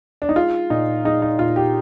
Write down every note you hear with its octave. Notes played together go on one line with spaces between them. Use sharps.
D4
D#4
G#3 F4
A#2 D#4
G#3 D#4
D#4
A#2 F4
G4